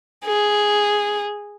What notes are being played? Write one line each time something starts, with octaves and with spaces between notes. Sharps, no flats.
G#4